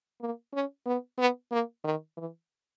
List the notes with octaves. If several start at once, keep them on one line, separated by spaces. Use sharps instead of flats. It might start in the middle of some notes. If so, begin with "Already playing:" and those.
A#3
C#4
B3
B3
A#3
D#3
E3